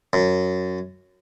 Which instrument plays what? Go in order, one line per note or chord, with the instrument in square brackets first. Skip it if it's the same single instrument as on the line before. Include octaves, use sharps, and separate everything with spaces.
[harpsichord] F#2